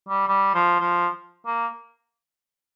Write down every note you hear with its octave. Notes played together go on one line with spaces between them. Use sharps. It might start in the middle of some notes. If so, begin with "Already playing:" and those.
G3
G3
F3
F3
A#3